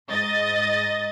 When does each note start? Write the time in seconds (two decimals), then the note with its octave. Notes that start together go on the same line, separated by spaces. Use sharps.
0.10 G#2 D#5 A6